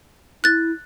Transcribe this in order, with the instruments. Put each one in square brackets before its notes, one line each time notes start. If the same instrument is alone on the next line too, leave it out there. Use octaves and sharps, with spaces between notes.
[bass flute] E4 [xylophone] F#6 A6